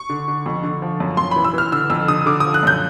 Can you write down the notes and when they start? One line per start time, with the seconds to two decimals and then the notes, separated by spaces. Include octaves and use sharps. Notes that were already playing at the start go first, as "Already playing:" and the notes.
Already playing: C#6
0.09 D3
0.28 D3
0.46 F2
0.63 D3
0.82 F3
1.00 F#2
1.17 F#2 C6
1.31 E3 B5
1.44 E6
1.54 E3 F6
1.72 D3 E6
1.90 F2 E6
2.08 D3 D#6
2.26 D3 D6
2.40 F3 D#6
2.54 F#6
2.63 F#2 G6